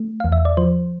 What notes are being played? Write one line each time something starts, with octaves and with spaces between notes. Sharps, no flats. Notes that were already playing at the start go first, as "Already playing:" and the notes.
Already playing: A3
E2 F5
E5
D5
F3 C5